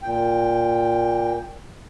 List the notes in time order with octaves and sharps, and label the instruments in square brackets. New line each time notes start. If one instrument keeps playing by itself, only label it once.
[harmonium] A#2 G5